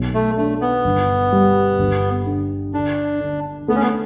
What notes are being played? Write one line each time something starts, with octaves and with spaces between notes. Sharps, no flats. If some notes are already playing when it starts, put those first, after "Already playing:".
Already playing: B1
A3
A3 D4
B3
G1
G3
G1
D3
D3 D4
D3
A3 B3
C#4
B3